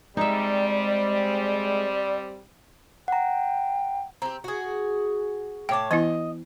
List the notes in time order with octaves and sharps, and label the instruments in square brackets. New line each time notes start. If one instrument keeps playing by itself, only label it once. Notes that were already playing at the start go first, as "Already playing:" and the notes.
[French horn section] G3 C4 [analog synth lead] G#3 [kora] D#4 E5 [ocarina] D5
[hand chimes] F#5 A#5 [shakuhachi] G5
[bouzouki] C4 G4 [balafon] A#5
[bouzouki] F#4 G#4
[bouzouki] A2 C#5 A5 [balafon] G5 D6
[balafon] E3 B3 E4 [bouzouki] D#5